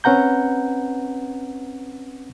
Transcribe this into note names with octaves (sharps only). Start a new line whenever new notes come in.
C4 C#4 B4 F#5 A#5 G6